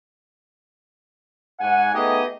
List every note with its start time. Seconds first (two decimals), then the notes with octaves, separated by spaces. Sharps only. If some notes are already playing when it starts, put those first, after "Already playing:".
1.60 G#2 F#5 G#5
1.93 A3 B3 D#4 G4 G#4 D#5